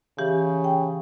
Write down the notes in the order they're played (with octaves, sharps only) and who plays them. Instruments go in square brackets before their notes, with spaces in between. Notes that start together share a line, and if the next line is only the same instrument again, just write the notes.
[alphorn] C#3 [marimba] E3 G4
[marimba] G5